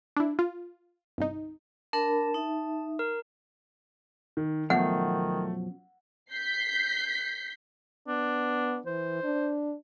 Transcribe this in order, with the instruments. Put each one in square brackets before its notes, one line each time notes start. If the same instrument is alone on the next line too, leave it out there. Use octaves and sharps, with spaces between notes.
[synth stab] D4 E4
F4
G1 C2 D#4
[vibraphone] D4 A#4 B5 [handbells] A5
[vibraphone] D#4 E5
[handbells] A#4
[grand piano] D#3
[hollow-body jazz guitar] F#2 B2 F3 [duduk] D#3 [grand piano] A3 [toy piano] F#5
[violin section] G6 B6 C7
[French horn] B3 [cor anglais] D4
[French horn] E3 [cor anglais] C5
[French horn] D4